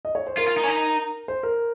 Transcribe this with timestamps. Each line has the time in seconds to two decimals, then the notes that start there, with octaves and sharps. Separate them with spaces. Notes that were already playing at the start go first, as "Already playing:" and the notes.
0.05 D#5
0.15 C#5
0.27 C5
0.37 F4 A#4
0.48 F4
0.57 D#4
0.63 C#4
0.68 D#4
1.28 C5
1.43 A#4